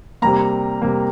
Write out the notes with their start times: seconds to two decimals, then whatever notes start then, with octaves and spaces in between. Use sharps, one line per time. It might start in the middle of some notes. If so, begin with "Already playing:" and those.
0.22 C3 G3 A#3 A#5
0.82 C3 G3 A#3